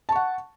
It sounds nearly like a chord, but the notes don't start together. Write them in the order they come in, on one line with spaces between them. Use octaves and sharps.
A5 C#6 F#5